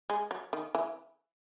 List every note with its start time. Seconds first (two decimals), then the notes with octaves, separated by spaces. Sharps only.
0.10 G#3
0.31 F#3
0.53 D#3
0.75 E3